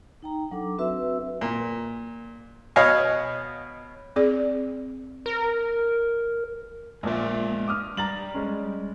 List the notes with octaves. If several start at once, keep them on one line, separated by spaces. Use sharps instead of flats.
D#4 G5 A#5
F#3 D4 A4 D6
C4 F#4 B4 E5 E6
A#2
B2 B3 C#5 D#5 F5 G#5
C4 G#4 D5
A#4
A#1 A#2 G#3 E5
D6 D#6 F6
G3 A#5 A6 F#7
G#3 C#4